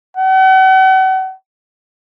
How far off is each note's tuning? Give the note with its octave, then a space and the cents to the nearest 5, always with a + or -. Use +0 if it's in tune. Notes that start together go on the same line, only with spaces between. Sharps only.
F#5 +40